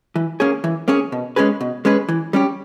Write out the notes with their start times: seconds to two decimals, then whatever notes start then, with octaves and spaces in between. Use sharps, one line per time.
0.16 E3
0.40 A#3 C#4 G#4 C#5
0.64 E3
0.88 A#3 C#4 G#4 C#5
1.12 B2
1.36 G#3 C#4 G#4 B4
1.61 B2
1.85 G#3 C#4 G#4 B4
2.09 E3
2.33 G3 C#4 G4